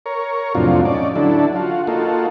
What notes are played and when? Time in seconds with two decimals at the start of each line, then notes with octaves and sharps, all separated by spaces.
0.06 A#4 C#5
0.55 F2 A2 C3 F#3 D4 F4
0.85 C#4 D#4 D5
1.15 D3 F#3 D4 E4 A4
1.55 F4 F#4
1.87 A#3 D#4 F4 F#4 A4